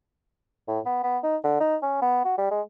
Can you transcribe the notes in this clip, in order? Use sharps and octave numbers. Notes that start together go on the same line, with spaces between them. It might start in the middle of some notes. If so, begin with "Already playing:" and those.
A2
B3
B3
D#4
D3
D#4
C#4
B3
F#4
G3
G#3